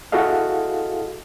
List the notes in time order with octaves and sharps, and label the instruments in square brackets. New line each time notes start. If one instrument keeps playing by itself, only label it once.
[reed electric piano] E4 F#4 G#4 A4 D#5 F5